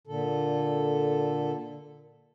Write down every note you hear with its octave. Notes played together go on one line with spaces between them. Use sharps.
A#2 D3 A4